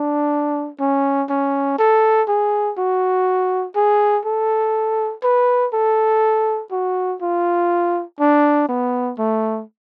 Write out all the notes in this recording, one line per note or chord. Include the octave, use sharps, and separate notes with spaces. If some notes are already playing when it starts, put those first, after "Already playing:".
Already playing: D4
C#4
C#4
A4
G#4
F#4
G#4
A4
B4
A4
F#4
F4
D4
B3
A3